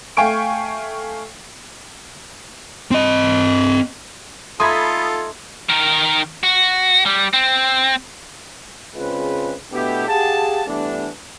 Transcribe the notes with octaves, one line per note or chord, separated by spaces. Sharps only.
A3 F5 G5 G#5 C#6 D7
C4 D#5
A3 D#4 F4 A4 B5 C6 D#6 G#6
D#3 A#4
F#4
G3
C4
C#3 G#3 C4 F4 B4
B2 A3 B3 D4 E4 G4
G4 G#4 F5 F#5 A5
G2 E3 A3 B3 D4